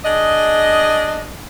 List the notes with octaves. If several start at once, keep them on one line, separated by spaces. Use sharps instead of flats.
D4 G#4 D#5